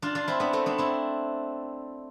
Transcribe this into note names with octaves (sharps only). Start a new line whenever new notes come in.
D4 F4
D4 F4
C4 E4
B3 D4
A3 C4
B3 D4
C4 E4